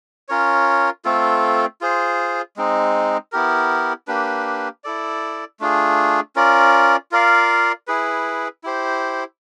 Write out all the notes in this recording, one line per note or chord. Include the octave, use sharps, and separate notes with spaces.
C#4 F4 A#4 C#5
A3 C4 F4 A4
F4 G#4 C5
G#3 C4 D#4
B3 E4 G4 A#4
A#3 D4 G4 B4
E4 A4 D5
A3 D4 F4 G#4
C#4 F4 A#4 D5
F4 A#4 D5 F5
E4 G#4 B4
E4 G4 C5